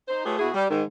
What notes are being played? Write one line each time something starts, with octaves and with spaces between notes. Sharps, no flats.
D#4 C5
A3 F4 G4 G#4 B4 C#5
B2 E4 F#4 G#4
G3
G#2 D#3